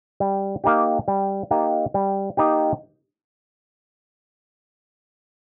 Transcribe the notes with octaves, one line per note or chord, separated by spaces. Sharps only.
G3
A#3 D#4 G4
G3
A#3 D#4 G4
G3
A#3 D#4 G4